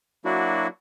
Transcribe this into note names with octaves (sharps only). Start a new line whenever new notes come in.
F#3 A#3 D4 E4 F#4